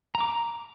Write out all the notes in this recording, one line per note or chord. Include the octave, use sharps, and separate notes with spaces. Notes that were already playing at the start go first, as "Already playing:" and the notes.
A#5
D6
A#5